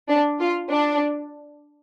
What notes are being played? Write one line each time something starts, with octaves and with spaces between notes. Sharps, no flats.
D4
F4
D4